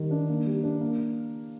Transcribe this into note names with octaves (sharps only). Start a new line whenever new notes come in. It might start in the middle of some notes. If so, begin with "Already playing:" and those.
Already playing: D#3 G3
D4
A#3
G3
D4
A#3